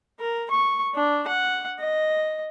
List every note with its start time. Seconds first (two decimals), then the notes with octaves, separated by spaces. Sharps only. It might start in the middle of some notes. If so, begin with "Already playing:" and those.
0.20 A#4
0.50 C#6
0.95 D4
1.27 F#5
1.80 D#5